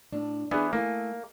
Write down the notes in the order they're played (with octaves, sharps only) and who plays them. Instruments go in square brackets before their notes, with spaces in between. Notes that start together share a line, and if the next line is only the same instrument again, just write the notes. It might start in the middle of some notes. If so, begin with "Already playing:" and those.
[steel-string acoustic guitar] A2 D4
[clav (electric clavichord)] E3 B3 [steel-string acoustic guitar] D4 G#4
[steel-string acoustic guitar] A3 E4 G#5 [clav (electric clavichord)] A#3